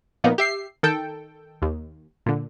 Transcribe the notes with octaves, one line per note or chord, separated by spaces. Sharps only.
A#2 F3 A#3 B3 D#4
G4 E5 C7
D#3 A4 G5
D#2
A#2 D3